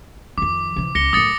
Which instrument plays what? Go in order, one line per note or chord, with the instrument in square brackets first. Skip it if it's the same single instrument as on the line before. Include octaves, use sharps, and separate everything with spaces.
[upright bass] F2 D#3 [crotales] D6
[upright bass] C3 E3
[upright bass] C#2 [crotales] A#6 C#7 G7
[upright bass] F#2 A2 [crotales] D#6 A6 C#7